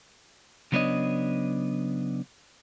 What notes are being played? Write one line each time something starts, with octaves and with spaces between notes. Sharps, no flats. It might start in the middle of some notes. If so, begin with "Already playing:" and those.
C#3 F#3 B3 D4 C#5 D#5